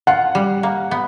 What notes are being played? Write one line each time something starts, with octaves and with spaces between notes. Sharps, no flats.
F4 F#5
G3
A#3
B3